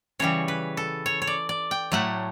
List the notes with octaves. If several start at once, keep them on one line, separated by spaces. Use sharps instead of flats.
C#3 E3 G3 C#5
B4
A4
C#5
C#5
D5
D5
G5
A2 F#3 A3 F#5